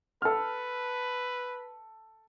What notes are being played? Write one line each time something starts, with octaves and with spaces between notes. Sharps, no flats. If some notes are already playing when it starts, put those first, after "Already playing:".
A4 B4 F6